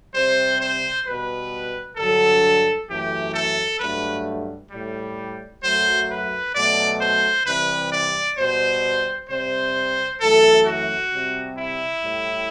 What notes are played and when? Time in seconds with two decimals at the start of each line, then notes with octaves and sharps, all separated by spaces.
0.14 C3 G3 C5
0.60 C5
1.06 B2 G3 B4
1.97 G2 D3 F#3 A4
2.88 F#2 E3 A3 G4
3.34 A4
3.80 G2 F#3 A3 B4
4.71 A2 G3
5.63 F#2 F#3 A3 C5
6.10 B4
6.55 B2 F#3 A3 D5
7.01 C5
7.46 C3 E3 G3 B4
7.92 D5
8.38 B2 G3 C5
9.30 C3 G3 C5
10.21 F#2 E3 A3 A4
10.66 F#4
11.12 C3 G3
11.58 E4
12.03 A2 G3